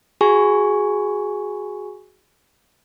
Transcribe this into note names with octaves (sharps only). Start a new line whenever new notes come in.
F#4 G#4 G#5 C#6